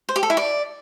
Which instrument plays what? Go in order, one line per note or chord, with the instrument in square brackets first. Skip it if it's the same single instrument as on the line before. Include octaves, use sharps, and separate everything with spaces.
[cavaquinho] C5
G4
A4
E4
D5